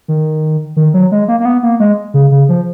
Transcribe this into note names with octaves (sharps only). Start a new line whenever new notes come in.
D#3
D#3
F#3
G#3
A#3
A#3
B3
A#3
G#3
C#3
C#3
F3